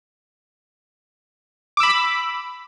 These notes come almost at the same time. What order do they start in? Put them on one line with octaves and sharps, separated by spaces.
D6 E6 B5